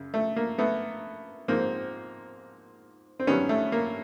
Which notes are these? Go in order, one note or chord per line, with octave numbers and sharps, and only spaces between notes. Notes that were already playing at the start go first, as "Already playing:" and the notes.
Already playing: F#2 C#3
A3
A#3
A3 B3
G#2 F3 A#3 C4
C4
G2 D#3 F#3 B3 C#4
A3
A#3